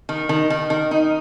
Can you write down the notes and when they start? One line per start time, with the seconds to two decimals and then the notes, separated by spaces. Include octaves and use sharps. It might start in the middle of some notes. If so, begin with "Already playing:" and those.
0.09 D#3
0.29 D#3
0.50 D#3
0.70 D#3
0.91 D#4